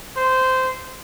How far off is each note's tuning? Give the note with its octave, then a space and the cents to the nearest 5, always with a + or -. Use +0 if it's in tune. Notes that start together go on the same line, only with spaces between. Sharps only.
C5 -15